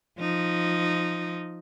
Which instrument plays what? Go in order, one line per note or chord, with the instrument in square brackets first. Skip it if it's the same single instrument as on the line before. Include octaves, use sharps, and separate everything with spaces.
[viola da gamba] F3 D#4